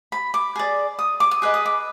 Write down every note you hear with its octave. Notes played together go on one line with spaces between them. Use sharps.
B5
D6
G#4 D5
D#6
D6
D#6
G#4 B4 D#5 D6
D#6
D6